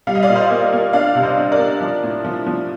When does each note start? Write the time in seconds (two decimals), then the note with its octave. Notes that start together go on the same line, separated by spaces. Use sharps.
0.07 G3 F5
0.15 D#5
0.23 D5 F5
0.29 A#2
0.35 C5 D#5
0.50 A#3
0.73 A#3
0.93 D4 D5 F5
1.15 C3
1.23 C5 D#5
1.37 D4
1.52 A#4 D5
1.60 D4
1.80 F3
2.03 A2
2.24 F3
2.46 F3